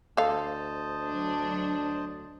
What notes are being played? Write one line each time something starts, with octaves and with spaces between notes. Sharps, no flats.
D2 A4 C5 D#5 F5 A5
F#3 D4